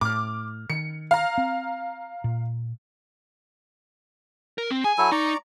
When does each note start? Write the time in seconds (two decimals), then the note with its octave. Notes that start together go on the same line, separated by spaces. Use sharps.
0.01 A2 D6 F6
0.70 D#3 C#7
1.11 F5 A#5
1.38 C4
2.24 A#2
4.58 A#4
4.71 C4
4.84 G#4 G#5
4.98 F#3 E4 A4
5.12 D#4 D5 A#5 C#6